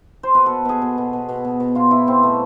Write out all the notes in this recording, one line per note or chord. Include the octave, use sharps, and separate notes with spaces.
C5
B2 B4
B2 A4
B2 G#4
B2
B2
B2
B2
B2
B2
B2 F4
B2 E4
B2 C4
B2 A3